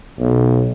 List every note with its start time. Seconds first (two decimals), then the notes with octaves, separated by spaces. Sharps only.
0.19 B1